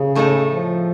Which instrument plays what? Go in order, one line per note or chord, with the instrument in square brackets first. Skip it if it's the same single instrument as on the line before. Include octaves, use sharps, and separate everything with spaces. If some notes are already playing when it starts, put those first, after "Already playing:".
Already playing: [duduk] C#3
[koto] A2 A3 D#4 A4
[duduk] F3